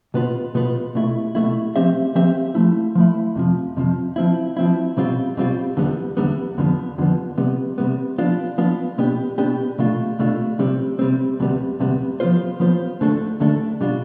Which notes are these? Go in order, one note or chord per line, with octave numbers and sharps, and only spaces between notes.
B2 B3 F4 B4
B2 B3 F4 B4
C2 B2 A3 E4
C2 B2 A3 E4
F3 C4 G4 C5 E5
F3 C4 G4 C5 E5
F3 A3 E4
F3 A3 E4
F2 C3 F3
F2 C3 F3
F3 C4 E4
F3 C4 E4
C2 B2 G3 C4 F4
C2 B2 G3 C4 F4
E2 D3 G3 B3
E2 D3 G3 B3
F2 D3 F3 B3
F2 D3 F3 B3
C3 G3 B3
C3 G3 B3
F3 B3 D4 F4
F3 B3 D4 F4
B2 B3 D4 G4
B2 B3 D4 G4
C2 B2 A3 D4 F4
C2 B2 A3 D4 F4
C3 G3 C4
C3 G3 C4
D2 C3 G3 B3
D2 C3 G3 B3
F3 B3 F4 C5
F3 B3 F4 C5
D2 D3 A3 D4 A4
D2 D3 A3 D4 A4
B2 G3 D4 F4